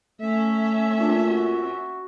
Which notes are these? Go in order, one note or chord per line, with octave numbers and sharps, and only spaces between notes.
A3 C#4 E5
A#2 D4
F#4